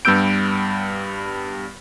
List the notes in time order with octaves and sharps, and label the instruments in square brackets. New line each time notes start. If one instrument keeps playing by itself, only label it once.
[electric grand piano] G2 G3 B3 E6 G6 D7